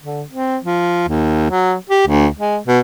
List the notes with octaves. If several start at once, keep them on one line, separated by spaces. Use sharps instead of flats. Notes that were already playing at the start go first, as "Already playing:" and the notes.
D3
C4
F3
D#2
F#3
G4
D2
G#3
B2